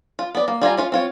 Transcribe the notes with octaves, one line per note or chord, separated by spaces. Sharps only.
F4
B3 D5
A#3
G3 F4 G#5 A#5
C#4 F4 F5
C4 F4 C#5